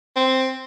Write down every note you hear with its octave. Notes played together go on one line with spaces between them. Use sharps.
C4